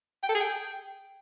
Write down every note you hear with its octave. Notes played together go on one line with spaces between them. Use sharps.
G5
A4
G#4
G5